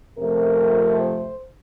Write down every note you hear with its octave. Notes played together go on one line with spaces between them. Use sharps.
F2 C3 F3 A3 A#4
C5